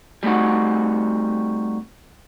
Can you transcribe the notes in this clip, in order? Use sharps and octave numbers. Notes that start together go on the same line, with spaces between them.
G3 A3 C4 D#4 F#4